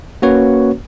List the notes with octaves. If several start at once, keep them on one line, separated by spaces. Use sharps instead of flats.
A#3 C#4 F#4 B4 C#5